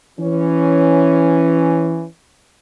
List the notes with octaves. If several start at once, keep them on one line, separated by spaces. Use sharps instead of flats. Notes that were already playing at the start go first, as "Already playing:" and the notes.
E3 C#4